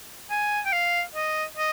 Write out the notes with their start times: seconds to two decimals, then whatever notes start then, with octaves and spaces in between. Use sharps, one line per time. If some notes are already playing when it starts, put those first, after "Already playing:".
0.31 G#5
0.65 G5
0.72 F5
1.15 D#5
1.57 D#5